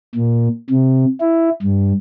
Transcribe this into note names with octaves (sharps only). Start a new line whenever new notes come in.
A#2
C3
E4
G2